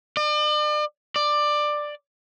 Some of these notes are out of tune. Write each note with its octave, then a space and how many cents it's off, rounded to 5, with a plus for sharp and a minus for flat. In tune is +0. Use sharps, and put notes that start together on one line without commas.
D5 +40
D5 +15